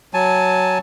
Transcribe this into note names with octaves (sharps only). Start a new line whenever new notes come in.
F#3 G#5 A5